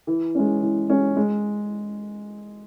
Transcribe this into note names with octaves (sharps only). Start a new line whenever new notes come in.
E3
G#3 C#4
E3
G#3 C#4
G#3